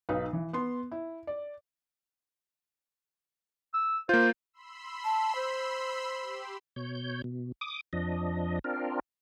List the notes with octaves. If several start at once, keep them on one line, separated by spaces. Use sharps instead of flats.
B1 D#4 B4 F5
E3
B3 C6
E4
D5
E6
A#3 F4 C5
B5 C6 E6
A5
C5
G4
B2 C#5 G6
B2
D6 D#6
F2 F3 D4 D#5
C4 D4 F4 A#4